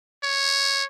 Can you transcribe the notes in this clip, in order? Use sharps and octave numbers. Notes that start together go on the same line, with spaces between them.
C#5